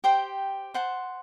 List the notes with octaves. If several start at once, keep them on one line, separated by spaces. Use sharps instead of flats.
G4 C5 G5
C5 F#5 A5 C6